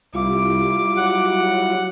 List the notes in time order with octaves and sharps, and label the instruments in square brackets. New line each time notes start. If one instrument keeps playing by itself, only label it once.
[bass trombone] C2 [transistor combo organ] G3 E4 F4 [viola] D6
[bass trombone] F#3 [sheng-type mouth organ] F#5